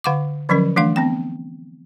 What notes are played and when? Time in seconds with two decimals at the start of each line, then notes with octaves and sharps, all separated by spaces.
0.04 D3 F5 F#5 C#6 D6
0.49 D3 F3 F#3 C#4 A#4
0.76 E3 A3 D4 F5
0.96 B3 C4 G5